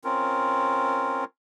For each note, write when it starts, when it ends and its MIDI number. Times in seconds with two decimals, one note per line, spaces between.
0.04 1.25 60
0.04 1.25 61
0.04 1.25 65
0.04 1.25 70